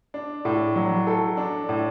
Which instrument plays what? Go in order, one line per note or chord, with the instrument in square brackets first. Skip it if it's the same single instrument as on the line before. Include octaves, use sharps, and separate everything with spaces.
[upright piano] D4
A2
F#3
A4
D4
A2